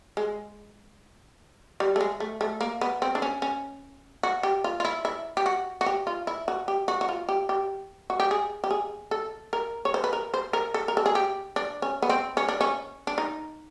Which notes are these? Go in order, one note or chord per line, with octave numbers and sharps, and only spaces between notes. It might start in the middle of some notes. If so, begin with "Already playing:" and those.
G#3
G3
A3
G#3
A3
A3
A#3
B3
C4
D4
C#4
C#4
F#4
G4
F4
F4
E4
E4
G4
F#4
F#4
G4
F4
E4
F#4
G4
F#4
F#4
F4
G4
G4
F#4
G4
G#4
G4
G#4
A4
A#4
C#5
C5
B4
A#4
C5
A#4
A4
A#4
A4
G#4
G4
D4
C#4
B3
C4
C#4
D4
C#4
D4
D#4